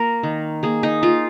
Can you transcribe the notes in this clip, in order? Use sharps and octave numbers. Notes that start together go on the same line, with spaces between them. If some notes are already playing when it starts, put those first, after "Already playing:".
Already playing: A#3 A#4
D#3
A#3 G#4
D#4
A#3 F4